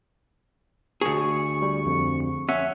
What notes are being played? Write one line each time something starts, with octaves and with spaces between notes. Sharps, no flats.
D2 G#4 C#6
G3
F2
C#4 E5 F#5 C#7